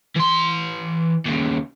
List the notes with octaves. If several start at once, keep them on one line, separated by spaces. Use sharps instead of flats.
E3 C6
D#2 C#3